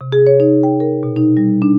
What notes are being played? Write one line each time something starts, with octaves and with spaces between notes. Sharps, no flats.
C3
G#4
C#5
D#4
G5
A#4
B2
D#4
G3
D4